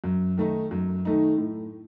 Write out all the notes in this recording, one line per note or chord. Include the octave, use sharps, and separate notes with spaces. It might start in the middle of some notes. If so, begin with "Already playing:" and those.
F#2
D#3 A3 D#4
F#2
D#3 A3 D#4
A2